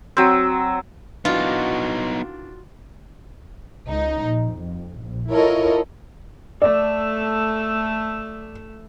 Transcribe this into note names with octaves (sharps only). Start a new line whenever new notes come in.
F#3 C4
D#3 E3 B3 D4 D#4 F4 F#4
C#2 D#4
A#1
F2
A#1
E4 F4 A4 A#4 C#5 D#5
A3 A4 D5